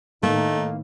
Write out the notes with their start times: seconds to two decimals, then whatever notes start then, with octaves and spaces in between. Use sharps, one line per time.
0.23 A2 D#3 A3 A#3 D#4